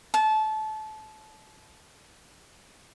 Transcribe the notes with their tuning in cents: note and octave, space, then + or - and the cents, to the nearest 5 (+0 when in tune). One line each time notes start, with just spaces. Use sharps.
A5 -25